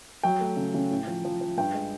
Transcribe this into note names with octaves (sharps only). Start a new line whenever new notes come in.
F#3 G5
A3
C#3
C#3
A2
F3
F3
F3
G2 G5
G#3